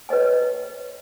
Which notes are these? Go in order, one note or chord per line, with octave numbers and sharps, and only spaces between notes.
B4 C#5 D#5 G#5